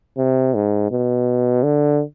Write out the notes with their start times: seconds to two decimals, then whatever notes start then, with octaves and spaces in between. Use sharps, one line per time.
0.17 C3
0.54 G#2
0.91 B2
1.63 D3